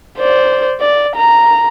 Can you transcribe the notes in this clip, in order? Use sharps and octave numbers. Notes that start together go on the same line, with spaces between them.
C5 D5
D5
A#5